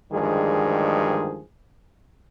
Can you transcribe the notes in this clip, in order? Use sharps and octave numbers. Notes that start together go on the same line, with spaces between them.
D2 G2 D#3 F3 G#3 G#4